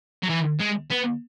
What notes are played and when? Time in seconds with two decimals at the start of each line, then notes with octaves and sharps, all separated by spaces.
0.23 F#3
0.29 E3
0.59 G#3
0.90 B3